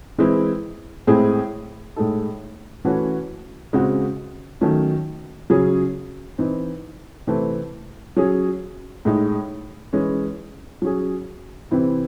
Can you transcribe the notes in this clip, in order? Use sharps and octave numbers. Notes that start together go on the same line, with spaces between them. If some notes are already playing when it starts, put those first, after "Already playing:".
E3 G#3 C4 E4
A2 G#3 C4 E4 G#4
A2 G#3 D#4 A4
E3 A3 C#4 F#4
C#3 G#3 C4 F#4
D#3 F#3 A3 C#4
C#3 F#3 C#4 G#4
E3 C4 D#4
C3 E3 A3 C4
F#3 C#4 G#4
A2 G#3 D#4
E3 G#3 C#4
F#3 C#4 G#4
C3 E3 C4 E4